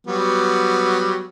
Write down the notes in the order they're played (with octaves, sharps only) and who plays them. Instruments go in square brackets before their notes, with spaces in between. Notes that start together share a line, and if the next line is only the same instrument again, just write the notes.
[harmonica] F#3 G3 B3